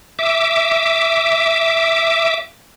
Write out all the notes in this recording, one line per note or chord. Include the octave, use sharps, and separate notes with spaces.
E5 D6